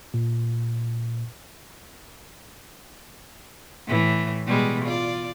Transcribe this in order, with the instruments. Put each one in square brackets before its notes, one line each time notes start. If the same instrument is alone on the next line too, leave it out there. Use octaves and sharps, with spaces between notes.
[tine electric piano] A#2
[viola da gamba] A2 E3
B2 G3 G#3
F4 D5